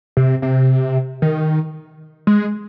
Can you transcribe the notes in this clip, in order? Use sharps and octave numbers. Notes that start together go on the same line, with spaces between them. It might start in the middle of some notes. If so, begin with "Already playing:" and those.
C3
C3
D#3
G#3